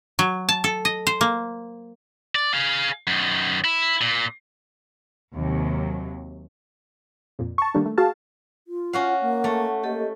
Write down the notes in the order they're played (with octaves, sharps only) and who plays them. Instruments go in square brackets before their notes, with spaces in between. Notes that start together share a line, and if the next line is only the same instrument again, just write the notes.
[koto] F#3
A5
A4
D#5
C5
A#3
[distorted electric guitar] D5
G#4 F5
F#2 D#3
E4
A#2
[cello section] D#2 C3 F#3
[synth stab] F2 A#2
A5 C#6
D#3 G3 A3 A#3 D4
A3
F#4 G#4 F5 A5
[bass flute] F4
[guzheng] C#4 F#4 F5 [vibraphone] F#5
[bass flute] A#3
[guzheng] A3
[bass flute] A#3 [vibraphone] G4 A4 D#5